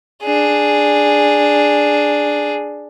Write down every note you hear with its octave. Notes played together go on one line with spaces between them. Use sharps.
D4 G#4